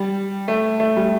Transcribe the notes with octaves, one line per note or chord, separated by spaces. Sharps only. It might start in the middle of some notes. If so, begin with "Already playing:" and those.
Already playing: G3
A3
A3
G3